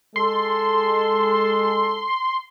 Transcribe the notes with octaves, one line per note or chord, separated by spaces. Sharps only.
G#3 A4 C6